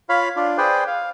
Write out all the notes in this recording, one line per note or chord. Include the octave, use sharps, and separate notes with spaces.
F4 C#5 F5 B5
D4 F4
G#4 B4 C5 D5 G5
F5